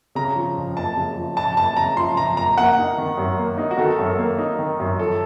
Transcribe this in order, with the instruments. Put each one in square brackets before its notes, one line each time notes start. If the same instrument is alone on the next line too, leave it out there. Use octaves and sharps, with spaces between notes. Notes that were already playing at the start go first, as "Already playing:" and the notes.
[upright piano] C#3 [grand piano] A#5
[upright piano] F3
F2
[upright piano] F#1 [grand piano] A5
[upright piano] C#3
F3
[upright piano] F2 [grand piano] A5
[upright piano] F#1 [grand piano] A5
[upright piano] C#3 [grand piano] A#5
[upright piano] F3 [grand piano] C6
[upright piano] F2 [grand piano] A#5
[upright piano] F#1 [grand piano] A#5
[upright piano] A#3 [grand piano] F#5
[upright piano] D#4
D#3
F#2
A#3
D#4
[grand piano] F#4
[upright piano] D#3 [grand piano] A4
[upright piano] F#2
A#3
D#4
D#3
F#2
[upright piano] F3 [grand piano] A4